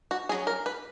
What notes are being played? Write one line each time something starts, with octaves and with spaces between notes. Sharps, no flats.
F#4
F#3 C#4 G#4
A#4
B4